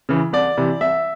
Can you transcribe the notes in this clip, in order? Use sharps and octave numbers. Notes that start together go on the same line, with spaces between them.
C#3 E3
C2 D5
C3 E3
C2 E5